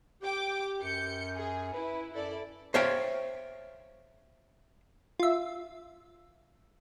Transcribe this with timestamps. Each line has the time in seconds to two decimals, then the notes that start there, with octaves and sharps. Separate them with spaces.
0.22 G4 G5 D6
0.83 F#2 G6 C#7
1.36 G#4
1.74 E4 B4
2.13 F#2 E4 A4 D5
2.74 C5 C#5 E5 F5 G5
5.20 F4 E5